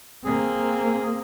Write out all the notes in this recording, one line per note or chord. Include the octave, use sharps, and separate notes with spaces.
A#3 C4 G#4